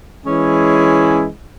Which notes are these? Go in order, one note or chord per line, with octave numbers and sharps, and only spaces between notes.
E3 G#3 C#4 E4 G#4